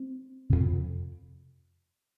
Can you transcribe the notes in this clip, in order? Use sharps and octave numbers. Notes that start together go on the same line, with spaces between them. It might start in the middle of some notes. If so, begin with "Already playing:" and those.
Already playing: C4
F2 C3